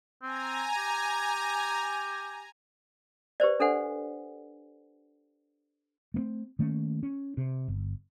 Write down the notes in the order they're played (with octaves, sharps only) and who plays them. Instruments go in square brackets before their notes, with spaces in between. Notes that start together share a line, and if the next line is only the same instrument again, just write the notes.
[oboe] C4 [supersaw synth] G#5 A#5
[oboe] G4
[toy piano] G4 B4 C5 D5
D4 A4 C5 F#5 G#5
[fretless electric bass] A3 A#3 C4
D#3 A3 A#3 C#4
C#4
C3
G1